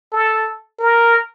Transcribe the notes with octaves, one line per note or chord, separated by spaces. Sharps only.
A4
A#4